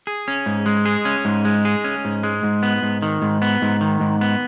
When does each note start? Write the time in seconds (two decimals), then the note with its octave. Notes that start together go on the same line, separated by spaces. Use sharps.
0.07 G#4
0.28 C#4
0.46 G#2
0.66 G#3
0.86 G#4
1.05 C#4
1.25 G#2
1.45 G#3
1.65 G#4
1.84 C#4
2.05 G#2
2.23 G#3
2.44 G#2
2.63 B3
2.83 G#2
3.02 D#3
3.22 G#2
3.42 B3
3.62 G#2
3.81 D#3
4.00 G#2
4.21 B3